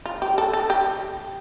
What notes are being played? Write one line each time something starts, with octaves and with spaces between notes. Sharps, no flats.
F4
G4
A4
A4
G4